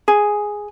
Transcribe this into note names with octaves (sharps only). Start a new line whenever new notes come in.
G#4